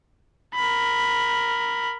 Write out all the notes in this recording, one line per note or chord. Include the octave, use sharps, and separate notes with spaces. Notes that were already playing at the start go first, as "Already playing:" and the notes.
A#4 B5